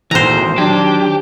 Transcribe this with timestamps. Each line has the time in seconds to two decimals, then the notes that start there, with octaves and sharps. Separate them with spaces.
0.11 G#1 D2 A#2 D#3 E3 C5 A#5
0.58 D#3 F#3 D4 G4